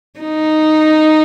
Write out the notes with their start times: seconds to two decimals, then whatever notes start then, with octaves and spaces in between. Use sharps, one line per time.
0.20 D#4